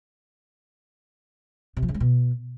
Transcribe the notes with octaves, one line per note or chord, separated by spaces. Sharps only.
C3
F3
C#3
G#3
B2